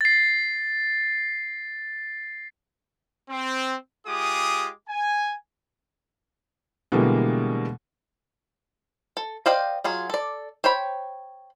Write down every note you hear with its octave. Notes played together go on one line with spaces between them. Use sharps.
A6 C7
C4
G#3 F4 G4 G#4 D6 D#6
G#5
B2 D3 E3 G3 G#3 A#3
A4
C5 D5 D#5 F5 G5
F#3 F4 G#4
A4 D5
C5 C#5 G5 B5